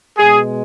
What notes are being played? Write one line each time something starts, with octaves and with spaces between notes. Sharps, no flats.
B2 G#3 G#4